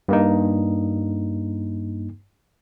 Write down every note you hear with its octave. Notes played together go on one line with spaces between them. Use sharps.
G2 A#3 D#4